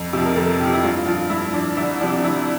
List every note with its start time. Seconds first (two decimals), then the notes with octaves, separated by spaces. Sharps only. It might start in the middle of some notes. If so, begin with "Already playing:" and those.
Already playing: F2
0.13 C3 F3
0.25 A#4
0.36 F2 A4
0.60 C3 F3 G4
0.73 E4
0.84 G2 F4
1.06 F3 F4
1.30 G2 E4
1.54 F3 D4
1.77 C2 E4
2.00 C3 F3 D4
2.24 C2 E4